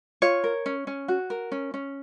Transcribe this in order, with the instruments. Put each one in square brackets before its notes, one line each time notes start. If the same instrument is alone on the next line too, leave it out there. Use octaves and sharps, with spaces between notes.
[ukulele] F4 C#5
A#4
C#4
C#4
F#4
A#4
C#4
C#4